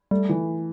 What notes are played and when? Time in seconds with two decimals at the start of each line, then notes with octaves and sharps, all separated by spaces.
0.11 G3 A3
0.29 E3